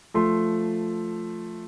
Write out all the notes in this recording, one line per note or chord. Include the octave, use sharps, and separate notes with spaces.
F3 A3 C6